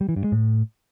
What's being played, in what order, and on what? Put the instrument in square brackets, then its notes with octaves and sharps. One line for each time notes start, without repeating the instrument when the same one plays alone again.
[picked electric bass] G3
E3
G2
G#3
A2